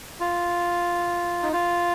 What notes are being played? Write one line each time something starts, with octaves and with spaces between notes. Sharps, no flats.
F4
D#4
F4